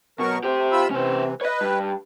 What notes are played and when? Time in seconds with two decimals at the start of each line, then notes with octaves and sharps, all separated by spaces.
0.19 B2 F#3 A#4 C#6
0.44 A3 G4 C5
0.72 F4 B5 E6
0.91 C3 E3 C#4 C5
1.41 B4 C#5 D#5
1.61 G2